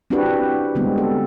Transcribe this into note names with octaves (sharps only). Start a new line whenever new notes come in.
C4 D4 E4 F#4 G4 B4
D3 G3 G#3 B3 C4
A4